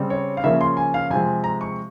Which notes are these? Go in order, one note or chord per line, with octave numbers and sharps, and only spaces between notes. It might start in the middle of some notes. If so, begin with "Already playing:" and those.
Already playing: C#3 G3 C4
C#5
F5
C#3 F3 A#3 C#4 E5
C6
G#5
F5
C3 F3 G#3 C4 G#5
A#5
C#6